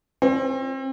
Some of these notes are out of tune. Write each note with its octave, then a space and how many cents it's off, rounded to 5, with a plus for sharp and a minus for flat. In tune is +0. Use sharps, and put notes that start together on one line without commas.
C4 +35